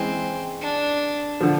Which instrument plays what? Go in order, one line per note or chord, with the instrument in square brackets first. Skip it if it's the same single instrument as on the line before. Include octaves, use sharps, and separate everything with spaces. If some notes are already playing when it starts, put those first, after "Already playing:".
Already playing: [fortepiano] E3 G#3 C#4 [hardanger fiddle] C4
[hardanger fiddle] D4
[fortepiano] D3 F3